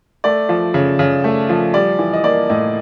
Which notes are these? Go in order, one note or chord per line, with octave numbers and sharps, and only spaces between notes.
A3 D5
F3
C#3
C#3
A3
F3
G3 D5
E3
D#5
A#3 D5
A2 D#5